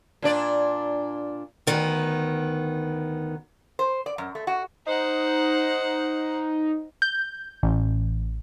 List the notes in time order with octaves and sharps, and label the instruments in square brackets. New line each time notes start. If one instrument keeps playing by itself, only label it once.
[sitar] A#2 D4 D5
[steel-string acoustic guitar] D2 D#3 B3
[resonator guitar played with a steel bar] C5
D5
F#2
A3
F#4
[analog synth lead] D#4 [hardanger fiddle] C5 F#5
[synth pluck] G6
A1